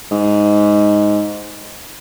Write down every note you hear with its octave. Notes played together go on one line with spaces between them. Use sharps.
G#2